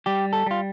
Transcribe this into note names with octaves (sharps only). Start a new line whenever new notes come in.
G3 G4
A4
G3 F4